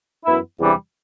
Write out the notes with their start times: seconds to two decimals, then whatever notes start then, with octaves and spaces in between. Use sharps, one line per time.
0.25 F#2 E3 B3 E4
0.59 E2 C3 E3 G3 D4